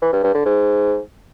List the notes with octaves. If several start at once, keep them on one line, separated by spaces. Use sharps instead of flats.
E3
G2
G2
D3
G#2